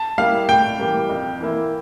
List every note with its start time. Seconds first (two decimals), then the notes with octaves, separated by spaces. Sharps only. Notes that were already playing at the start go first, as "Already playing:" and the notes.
Already playing: A5
0.18 G3 A#3 E4 G4 F5
0.49 A2 G5
0.79 E3 G3 A#3
1.09 F2
1.41 E3 A#3 E4